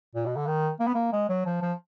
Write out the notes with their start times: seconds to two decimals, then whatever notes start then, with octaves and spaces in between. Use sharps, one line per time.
0.15 A#2
0.26 B2
0.36 D3
0.47 D#3
0.80 A#3
0.87 B3
0.95 A#3
1.13 G#3
1.29 F#3
1.46 F3
1.62 F3